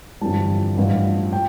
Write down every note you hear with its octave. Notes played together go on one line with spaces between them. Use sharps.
G1 F2 E3 G3 A5
A1 G2 F3
G5